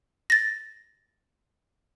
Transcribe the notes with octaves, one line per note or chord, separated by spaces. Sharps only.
A6 A#6